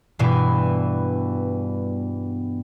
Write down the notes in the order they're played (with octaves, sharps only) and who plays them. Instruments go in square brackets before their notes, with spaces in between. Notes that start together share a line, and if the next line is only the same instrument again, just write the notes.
[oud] G2 B2 E3